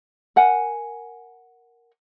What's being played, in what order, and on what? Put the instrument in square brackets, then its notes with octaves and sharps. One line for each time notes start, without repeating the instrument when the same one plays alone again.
[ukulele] A#4 F#5 G#5